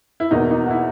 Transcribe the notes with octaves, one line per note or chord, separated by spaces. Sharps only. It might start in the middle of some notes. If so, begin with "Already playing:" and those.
E4
E2 B2 A#3 D#4
D#4
F#4
E4